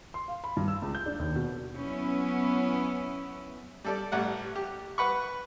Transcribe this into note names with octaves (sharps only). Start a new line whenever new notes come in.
C6
F5
B5
G2
E6
C#2
G6
D4
D#2
B2
F#3 B3 C#4 E4
G3 A4 D5
A1 G3 F#5
G4
B4 F#5 B5 C#6